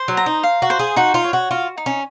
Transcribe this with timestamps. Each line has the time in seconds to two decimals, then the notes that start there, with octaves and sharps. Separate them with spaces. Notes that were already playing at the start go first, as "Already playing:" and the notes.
Already playing: C5
0.08 F#3
0.17 A#5
0.26 D#4
0.43 F5
0.62 F#4
0.70 C5
0.79 G#4
0.96 D#4 F#4
1.14 F4
1.24 C#5
1.33 F#4
1.51 F4 F#4
1.78 D#4
1.86 C#4